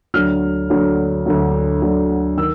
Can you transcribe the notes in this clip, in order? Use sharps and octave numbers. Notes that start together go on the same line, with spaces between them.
D2 D3 F#3 F6
D2 D3 F#3
D2 D3 F#3
D2 D3 F#3
D#3 E6